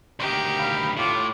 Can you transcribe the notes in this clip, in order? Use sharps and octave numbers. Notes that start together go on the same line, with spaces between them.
D2 D#3 D#4 G4
F5 B5
A2 F4 C#5 D6